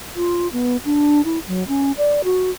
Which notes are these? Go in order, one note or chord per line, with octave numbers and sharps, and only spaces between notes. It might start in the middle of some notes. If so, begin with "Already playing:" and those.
F4
B3
D4
E4
F#3
C#4
D5
F#4